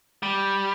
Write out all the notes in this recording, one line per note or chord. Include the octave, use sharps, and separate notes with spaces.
G3